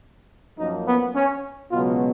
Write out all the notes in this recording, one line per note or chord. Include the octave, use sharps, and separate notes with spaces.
F#2 F3 A#3 D#4
B3
C#4
C#2 B2 F#3 B3 F4